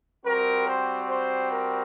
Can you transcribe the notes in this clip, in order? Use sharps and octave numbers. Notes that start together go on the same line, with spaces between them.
G3 C4 F#4 A#4
C5
C5
A#4